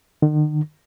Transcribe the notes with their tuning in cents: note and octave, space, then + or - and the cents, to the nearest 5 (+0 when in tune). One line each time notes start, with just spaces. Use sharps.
D#3 -45